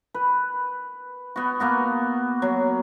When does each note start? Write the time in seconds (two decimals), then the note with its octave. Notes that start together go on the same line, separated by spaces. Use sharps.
0.14 B4
1.36 B3 F#4
1.60 A#3 B3 F#4
2.42 F#3